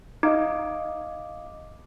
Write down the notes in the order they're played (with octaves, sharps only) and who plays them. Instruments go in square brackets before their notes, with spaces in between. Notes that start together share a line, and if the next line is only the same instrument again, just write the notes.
[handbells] D#4 [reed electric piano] D#5 F5 D6